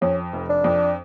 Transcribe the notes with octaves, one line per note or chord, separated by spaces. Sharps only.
F2 C#4
F1
D4
F2